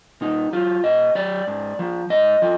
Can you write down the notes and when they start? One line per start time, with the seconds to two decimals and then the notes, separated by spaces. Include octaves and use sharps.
0.21 A#2 D#4
0.53 F#3 F4
0.84 A#2 D#5
1.15 F#3 D5
1.47 G#2
1.79 F3
2.10 G#2 D#5
2.42 F3